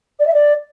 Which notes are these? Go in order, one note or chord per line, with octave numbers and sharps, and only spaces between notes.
D5
E5
D5